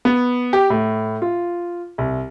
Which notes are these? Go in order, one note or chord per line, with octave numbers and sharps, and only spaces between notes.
B3
G4
A2
F4
C2